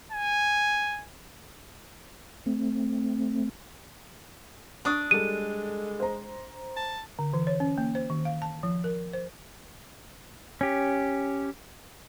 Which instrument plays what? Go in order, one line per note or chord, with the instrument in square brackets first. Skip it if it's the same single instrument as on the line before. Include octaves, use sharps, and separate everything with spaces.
[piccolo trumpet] G#5
[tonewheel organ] A3 C4
[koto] D4 [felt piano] C#6 D#6
[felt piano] G3 A4 [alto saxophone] G#3 [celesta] D#7
[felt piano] C5 A#5
[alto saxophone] A5
[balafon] D3
E3
C#5
C#4
A#3
C5
D#3
F5
A5
F3
A#4
C5
[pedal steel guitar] C#4 G4